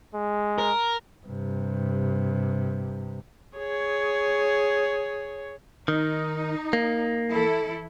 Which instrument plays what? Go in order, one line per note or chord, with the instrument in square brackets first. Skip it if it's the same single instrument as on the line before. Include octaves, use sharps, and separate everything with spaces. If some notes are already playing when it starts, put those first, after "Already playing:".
[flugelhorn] G#3
[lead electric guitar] A#4
[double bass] G2 C3
[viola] G#4 C#5
[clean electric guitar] D#3 [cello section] D#4
[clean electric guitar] A#3
[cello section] E3 E4 A4